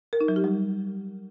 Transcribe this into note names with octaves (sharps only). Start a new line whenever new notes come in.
A#4
D#4
F#3
G4
G3